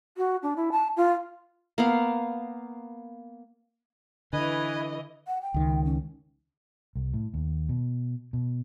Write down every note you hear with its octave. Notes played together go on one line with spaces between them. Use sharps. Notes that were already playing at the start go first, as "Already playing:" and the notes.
F#4
D4
E4
A5
F4
A#3 B3 F5
D3 E3 B4 D#5 G#5
F#5
G5
C#2 D#3
C#4
C2
A2
D#2
B2
B2